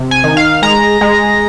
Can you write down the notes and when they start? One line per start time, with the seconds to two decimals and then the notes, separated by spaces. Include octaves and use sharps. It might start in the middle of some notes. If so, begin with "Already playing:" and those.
Already playing: C3
0.11 G#5
0.24 D#3
0.37 F5
0.62 G#3 A#5
1.01 G#3